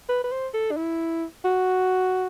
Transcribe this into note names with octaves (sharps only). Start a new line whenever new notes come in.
B4
B4
C5
A4
D4
E4
F#4